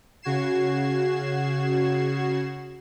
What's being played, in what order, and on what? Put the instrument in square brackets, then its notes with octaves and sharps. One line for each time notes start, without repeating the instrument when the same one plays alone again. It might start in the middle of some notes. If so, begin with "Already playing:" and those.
[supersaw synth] C#3 F#4 G#6 C7 E7